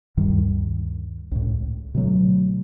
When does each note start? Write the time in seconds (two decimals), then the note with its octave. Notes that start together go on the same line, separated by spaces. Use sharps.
0.17 D2 G2 D#3 G3
1.32 C#2 A2
1.94 B2 D3 F#3 A3